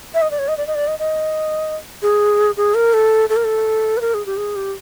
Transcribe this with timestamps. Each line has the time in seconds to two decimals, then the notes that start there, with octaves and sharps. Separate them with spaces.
0.14 E5
0.22 D#5
0.31 D5
0.39 C#5
0.48 D#5
0.57 D5
0.67 D#5
0.75 D5
0.87 D#5
0.99 D#5
2.02 G#4
2.57 G#4
2.75 A#4
2.93 A4
3.29 A4
3.36 A#4
3.44 A4
3.97 B4
4.01 A#4
4.14 G#4
4.26 G4
4.37 G#4
4.56 G4